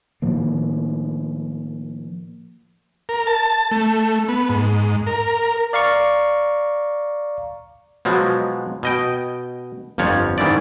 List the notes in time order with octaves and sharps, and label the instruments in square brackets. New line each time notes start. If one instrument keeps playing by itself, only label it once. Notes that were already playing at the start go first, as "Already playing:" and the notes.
[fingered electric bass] A2 D#3 F3 A#3
[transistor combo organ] A#4
A5
A3
B3
G#2
A#4
[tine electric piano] D5 F5 A#5 C#6
[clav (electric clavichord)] B2 F3 F#3 G#3
B2 D#5 G5
G1 F2 F3 C#5 F#5
G#2 D#3 E3 C#4 D5